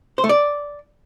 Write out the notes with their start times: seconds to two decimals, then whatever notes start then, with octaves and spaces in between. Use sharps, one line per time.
0.18 C5
0.24 A3
0.29 D5